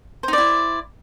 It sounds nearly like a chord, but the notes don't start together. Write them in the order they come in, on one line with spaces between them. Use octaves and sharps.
C5 D#4 D5 E4